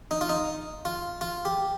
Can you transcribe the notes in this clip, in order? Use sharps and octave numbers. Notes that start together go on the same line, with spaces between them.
D#4
F4
D#4
F4
F4
G4